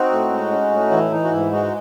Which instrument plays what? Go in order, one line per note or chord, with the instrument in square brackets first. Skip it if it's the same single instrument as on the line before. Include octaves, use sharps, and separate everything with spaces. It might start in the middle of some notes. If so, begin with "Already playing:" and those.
Already playing: [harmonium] C4 D#4 F#4
A2
G#3
C#4
A2
E3 E4
E3 D#4
F#4
G#2 E4
G#3 D#4 F#4